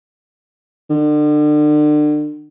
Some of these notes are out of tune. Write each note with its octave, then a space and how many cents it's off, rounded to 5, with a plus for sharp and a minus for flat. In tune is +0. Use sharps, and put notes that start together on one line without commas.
D3 +35